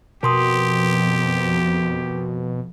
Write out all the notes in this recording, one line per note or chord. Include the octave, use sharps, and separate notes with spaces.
F2 B2 G4 A#4 C6 D#6